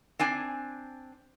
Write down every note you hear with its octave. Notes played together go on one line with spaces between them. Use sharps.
C4 D4 G#5